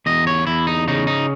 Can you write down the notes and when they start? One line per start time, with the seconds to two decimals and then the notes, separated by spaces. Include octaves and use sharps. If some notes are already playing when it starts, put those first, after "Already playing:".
0.06 E2 D#5
0.27 C#5
0.47 E2 E4
0.67 D#4
0.88 C#3 D#4
1.07 D#4